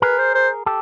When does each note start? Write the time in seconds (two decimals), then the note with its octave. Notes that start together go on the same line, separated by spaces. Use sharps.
0.02 G#4 A#4 B4
0.18 C5
0.34 C5
0.66 G4 A4